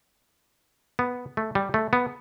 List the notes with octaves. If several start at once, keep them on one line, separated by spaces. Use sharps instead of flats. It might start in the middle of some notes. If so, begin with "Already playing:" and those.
B3
A3
G3
A3
B3